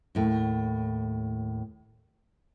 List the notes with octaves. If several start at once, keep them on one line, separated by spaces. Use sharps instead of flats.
D#2 A2